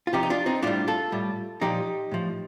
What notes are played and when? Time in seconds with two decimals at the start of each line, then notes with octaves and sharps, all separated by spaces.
0.07 F4
0.13 C3 F3 D#4 G4
0.23 D#4
0.30 D4 F4
0.46 C4 D#4
0.62 A2 G3 D4 F4
0.88 F4 A4
1.12 A2 G3
1.62 A#2 F3 D#4 G4
2.12 A2 F3